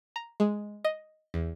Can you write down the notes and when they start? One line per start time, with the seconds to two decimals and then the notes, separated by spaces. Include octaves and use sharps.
0.16 A#5
0.40 G#3
0.85 D#5
1.34 E2